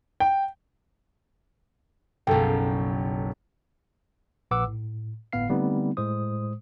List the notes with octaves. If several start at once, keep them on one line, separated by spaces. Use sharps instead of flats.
G5
F#1 B1 A4 G5
A#1 A#2 B4 F#5 D6 E6
A2
G1 A2 B3 F5 C7
D3 G3 A3 B3 C4 D#4
A2 G#3 C5 D#6